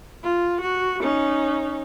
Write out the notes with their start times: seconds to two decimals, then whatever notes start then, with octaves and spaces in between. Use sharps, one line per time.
0.23 F4
0.61 F#4
1.02 C#4 D#4